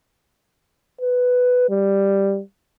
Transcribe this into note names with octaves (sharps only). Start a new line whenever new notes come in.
B4
G3